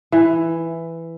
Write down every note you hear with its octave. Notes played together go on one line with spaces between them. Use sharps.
E3